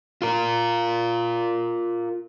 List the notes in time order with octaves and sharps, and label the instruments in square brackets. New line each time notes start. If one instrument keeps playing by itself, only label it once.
[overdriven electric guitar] F4 A#4